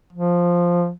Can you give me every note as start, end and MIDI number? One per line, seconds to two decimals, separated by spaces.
0.13 0.91 53